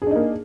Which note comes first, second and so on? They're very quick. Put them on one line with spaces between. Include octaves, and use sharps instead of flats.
G#4 D4 D#4 A#3